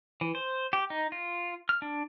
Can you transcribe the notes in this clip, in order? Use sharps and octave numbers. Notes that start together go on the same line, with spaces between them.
E3
C5
G4
D#4
F4
F6
D4